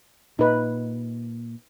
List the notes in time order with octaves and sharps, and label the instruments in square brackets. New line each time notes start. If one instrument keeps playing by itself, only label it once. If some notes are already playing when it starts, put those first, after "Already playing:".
[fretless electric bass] A#2 [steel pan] D#4 B4